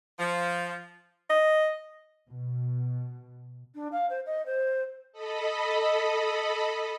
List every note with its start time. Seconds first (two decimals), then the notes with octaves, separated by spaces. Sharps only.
0.19 F3
1.30 D#5
2.30 B2
3.75 D4
3.92 F5
4.10 C5
4.26 D#5
4.46 C5
5.12 A4 D#5 B5